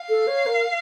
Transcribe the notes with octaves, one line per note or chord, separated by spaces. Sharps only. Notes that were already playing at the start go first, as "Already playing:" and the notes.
Already playing: F5
A4
C#5
A#4